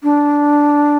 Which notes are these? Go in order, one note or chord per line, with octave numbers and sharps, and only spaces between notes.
D4